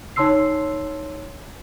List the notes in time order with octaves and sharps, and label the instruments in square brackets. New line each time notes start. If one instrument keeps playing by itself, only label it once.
[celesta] D#4 C#5 A5 C6 E6 C7